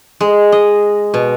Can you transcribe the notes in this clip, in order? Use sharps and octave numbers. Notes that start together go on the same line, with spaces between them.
G#3
D#5
B2